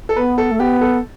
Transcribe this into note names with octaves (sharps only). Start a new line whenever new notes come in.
A4
B3 B4
A4
A3
B3 G4
A4